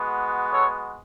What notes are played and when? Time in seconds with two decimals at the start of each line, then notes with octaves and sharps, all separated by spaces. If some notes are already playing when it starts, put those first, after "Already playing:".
Already playing: G#3 B3 F#4
0.52 A4 C#5